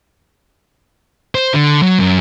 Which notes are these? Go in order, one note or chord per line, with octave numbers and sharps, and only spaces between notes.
C5
D3
F#3
F#2